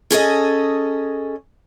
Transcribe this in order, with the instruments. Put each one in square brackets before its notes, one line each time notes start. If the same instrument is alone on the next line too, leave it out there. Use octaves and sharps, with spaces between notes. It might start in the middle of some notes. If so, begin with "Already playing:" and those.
[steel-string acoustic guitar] C#4 G#4 A4 D#5